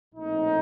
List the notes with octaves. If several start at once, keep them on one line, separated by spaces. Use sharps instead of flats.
A#1 A2 A3 C4 D#4